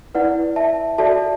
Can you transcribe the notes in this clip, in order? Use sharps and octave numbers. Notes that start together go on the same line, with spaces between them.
E4 B4 D5 F#5
E5 A5
F#4 A4 D5 E5 A5